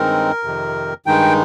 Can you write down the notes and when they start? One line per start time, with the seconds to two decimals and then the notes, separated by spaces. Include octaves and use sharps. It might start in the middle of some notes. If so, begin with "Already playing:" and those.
Already playing: G2 D#3 G#3 C4 D#4 A#4
0.44 F2 C3 D#3
1.06 G2 D#3 G#3 D#4 G5